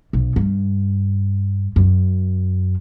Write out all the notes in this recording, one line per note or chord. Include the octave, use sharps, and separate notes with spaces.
B1
G2
F#2